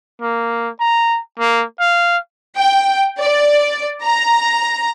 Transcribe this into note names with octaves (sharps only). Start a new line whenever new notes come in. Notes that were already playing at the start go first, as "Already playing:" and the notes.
A#3
A#5
A#3
F5
G5
D5
A#5